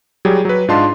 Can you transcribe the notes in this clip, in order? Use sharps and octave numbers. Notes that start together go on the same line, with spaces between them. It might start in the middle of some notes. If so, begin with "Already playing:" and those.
F#3 G3 G4 G#4
F#3 B4
G#2 D4 F4 D#5 A5 C6